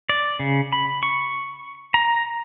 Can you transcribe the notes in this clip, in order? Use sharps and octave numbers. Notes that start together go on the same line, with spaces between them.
D5
C#3
B5
C#6
A#5